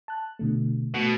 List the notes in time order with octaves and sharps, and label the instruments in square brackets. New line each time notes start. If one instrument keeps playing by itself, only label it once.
[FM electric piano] A5 F#6
B2 D3 A3
[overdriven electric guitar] B2 [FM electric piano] A3